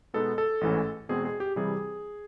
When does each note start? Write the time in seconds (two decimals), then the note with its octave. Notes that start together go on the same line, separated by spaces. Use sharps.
0.14 B2 G#3 B3 D#4 A4
0.38 A4
0.61 A1 G#2 E3 A3 C#4
1.09 E2 B2 G#3 C4 G#4
1.25 G#4
1.40 G4
1.56 C3 E3 G3 G#4